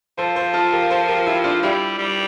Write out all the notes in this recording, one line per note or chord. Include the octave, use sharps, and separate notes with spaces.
F3 A4 C5
A4 C5
F4 A4
G4 A#4
A4 C5
G4 A#4
E4 G4
D4 F4
G3 E4 G4
G3